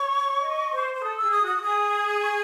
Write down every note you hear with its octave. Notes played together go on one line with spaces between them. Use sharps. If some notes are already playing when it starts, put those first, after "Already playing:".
Already playing: C#5 C#6
D#5
C5
C5
A4 D#6
G#4 E6
D#6
F#4 D#6
F#4
G#4 D#6
C#6